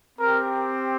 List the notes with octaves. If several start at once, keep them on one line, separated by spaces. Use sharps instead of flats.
C4 A#4
G4